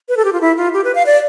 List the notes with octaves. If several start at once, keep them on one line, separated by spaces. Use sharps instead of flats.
B4
A4
G4
F4
E4
F4
G4
B4
F5
D5